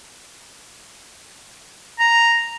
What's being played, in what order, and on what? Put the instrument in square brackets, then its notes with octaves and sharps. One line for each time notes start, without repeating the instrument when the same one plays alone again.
[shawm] A#5